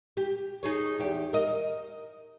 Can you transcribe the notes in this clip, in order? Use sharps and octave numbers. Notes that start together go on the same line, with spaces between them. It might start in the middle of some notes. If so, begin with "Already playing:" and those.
G4
D#4 G#4 C#5
E2 G4
A#4 D#5